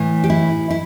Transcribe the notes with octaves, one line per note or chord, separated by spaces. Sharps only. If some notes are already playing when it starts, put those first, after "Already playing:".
Already playing: A2 E3
G4
E4
E4